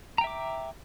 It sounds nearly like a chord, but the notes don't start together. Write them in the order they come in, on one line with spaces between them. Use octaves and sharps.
A#5 G5 E5 D6